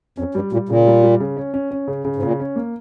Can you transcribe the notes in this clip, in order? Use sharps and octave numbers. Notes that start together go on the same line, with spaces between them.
F2 C#4
G2 G3
A#2 G3
A#2 C#3
G3
G3
C#3
C#4
C#4
C#4
C#3
C#3
G#2
A#2 C#3
C#4
A#3